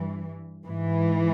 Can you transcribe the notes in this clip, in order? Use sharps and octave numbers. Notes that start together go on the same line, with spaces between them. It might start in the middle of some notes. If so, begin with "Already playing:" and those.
Already playing: G2 E3
G#2 E3